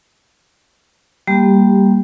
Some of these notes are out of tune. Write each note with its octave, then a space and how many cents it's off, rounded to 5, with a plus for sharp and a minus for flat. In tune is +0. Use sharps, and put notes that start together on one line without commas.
G3 +0 A#3 +0 G4 +0